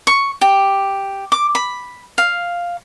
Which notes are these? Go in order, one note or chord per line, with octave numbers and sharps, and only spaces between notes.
C#6
G4
D6
B5
F5